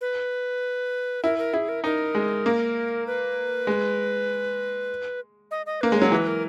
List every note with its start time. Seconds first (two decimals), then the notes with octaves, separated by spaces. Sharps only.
0.01 B4
1.23 E4 A#4
1.38 A#4
1.54 E4 G#4
1.68 A#4
1.84 D#4 A#4
2.15 G#3
2.46 A#3
3.07 B4
3.67 G#3
5.51 D#5
5.66 D#5
5.81 A#3 B4
5.92 G#3 C#5
6.02 F#3
6.12 E3 B4
6.27 A#4